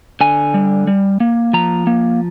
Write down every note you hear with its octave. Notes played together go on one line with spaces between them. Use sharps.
D3 G#5
G3
G3
A#3
F3 A#5
A#3